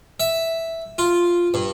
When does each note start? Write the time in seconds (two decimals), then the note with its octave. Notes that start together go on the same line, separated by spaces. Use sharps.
0.20 E5
0.98 F4
1.54 G2